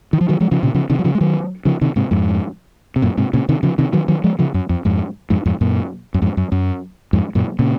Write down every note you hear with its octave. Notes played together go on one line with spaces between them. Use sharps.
D#3
F3
D#3 F#3
F3 G#3
C#3 F3
A#2 C#3
C#3 F3
C3 D#3
F#3
C#3 F3
G#3
D#3 F#3
C#3 F3
C3 D#3
G#2 C3
F2 G#2
C3
F#2 A#2
G#2 C3
A#2 C#3
C3 D#3
C#3 F3
C3 D#3
D#3 F#3
D#3 F#3
F3 G#3
C#3 F3
F#2
F2
F2 G#2
F2 G#2
F2 G#2
F#2 A#2
F#2
F2 G#2
F#2
F#2
F2 G#2
F#2 A#2
A#2 C#3